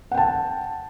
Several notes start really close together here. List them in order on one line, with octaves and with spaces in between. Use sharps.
F#5 G5 A5